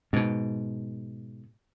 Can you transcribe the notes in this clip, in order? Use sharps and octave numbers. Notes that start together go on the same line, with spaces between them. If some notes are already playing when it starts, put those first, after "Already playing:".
G#2 B2